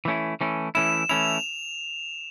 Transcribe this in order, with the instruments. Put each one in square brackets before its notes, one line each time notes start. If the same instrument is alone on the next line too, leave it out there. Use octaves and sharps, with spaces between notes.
[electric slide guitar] E3 A3 C#4 E4
E3 A3 C#4 E4
[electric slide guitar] E3 A3 C#4 E4 [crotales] E7
[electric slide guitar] E3 A3 C#4 E4 [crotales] F7